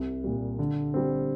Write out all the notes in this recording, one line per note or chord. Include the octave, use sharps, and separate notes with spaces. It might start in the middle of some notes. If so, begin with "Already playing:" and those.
Already playing: C2
A#2 G3
D3
G3 C4